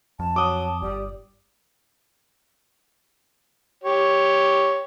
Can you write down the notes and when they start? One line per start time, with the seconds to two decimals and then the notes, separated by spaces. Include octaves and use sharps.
0.20 F2 A5
0.36 F#3 D6 D#6
0.82 G1 G3 D5
3.84 G4 C#5